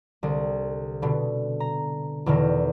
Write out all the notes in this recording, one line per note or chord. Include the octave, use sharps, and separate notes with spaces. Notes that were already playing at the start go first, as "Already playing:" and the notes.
C2 D3
B2 D3 B3
A#5
E2 B2 D3 D#3 A#6